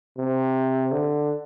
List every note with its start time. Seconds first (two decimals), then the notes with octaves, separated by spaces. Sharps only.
0.18 C3
0.92 D3